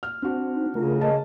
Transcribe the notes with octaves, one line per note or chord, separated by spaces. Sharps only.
F6
C4 D4 F#4
D#4
C#3 A3 F4 A#4
D#5 A5